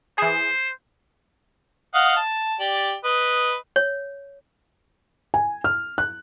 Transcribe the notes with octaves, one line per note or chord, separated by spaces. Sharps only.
E3 G#4 C5
D#5 F5 F#5
A5
G4 D5
B4 D#5
C#5
G#5
F6
F#6